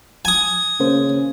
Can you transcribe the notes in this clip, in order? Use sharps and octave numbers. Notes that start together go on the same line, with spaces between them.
G#5 D#6
C#3 A#3 C#4 C5